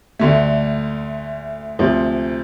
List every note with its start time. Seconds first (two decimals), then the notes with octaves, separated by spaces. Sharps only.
0.19 D2 D3 A3
1.79 D2 C3 F3